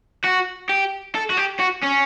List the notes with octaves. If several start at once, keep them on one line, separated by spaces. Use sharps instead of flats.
F#4
G4
A4
F#4
G4
F#4
C#4